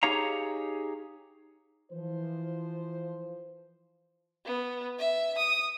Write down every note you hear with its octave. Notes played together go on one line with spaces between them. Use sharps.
D#4 G4 G#4 C#5 F5 A#5
E3 F3 C5
B3
E5
D#6